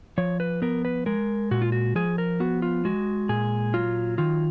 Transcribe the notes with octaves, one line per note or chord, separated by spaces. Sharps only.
F3 C#5
B4
B3 A#4
B4
G#3 A#4
A#2 F#4
F4
F#4
F3 G#4
A#4
B3 F#4
F4
G#3 F#4
A#2 G#4
F#3 F4
D#3 F4